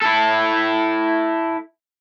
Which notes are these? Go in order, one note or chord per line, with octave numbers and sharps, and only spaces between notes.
E4 A4